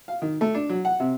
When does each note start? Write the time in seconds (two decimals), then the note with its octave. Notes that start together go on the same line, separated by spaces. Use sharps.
0.08 F5
0.22 D#3
0.41 A3
0.54 D4
0.69 F#3
0.85 F#5
1.00 C3